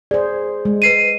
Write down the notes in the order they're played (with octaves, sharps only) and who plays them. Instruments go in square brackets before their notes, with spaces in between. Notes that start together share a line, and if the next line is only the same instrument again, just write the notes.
[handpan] G#4 C5 [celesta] D5
[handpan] G#3
[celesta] B4 C7 D#7